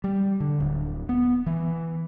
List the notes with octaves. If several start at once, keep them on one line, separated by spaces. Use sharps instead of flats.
G3
D3
D1
B3
E3